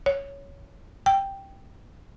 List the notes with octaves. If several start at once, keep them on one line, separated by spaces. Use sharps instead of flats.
C#5
G5